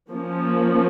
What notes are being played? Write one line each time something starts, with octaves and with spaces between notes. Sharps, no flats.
F3 A#3 C#4